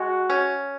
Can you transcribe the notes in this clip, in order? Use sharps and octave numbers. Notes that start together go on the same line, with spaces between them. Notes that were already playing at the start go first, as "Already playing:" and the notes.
Already playing: G#3 F#4
C#4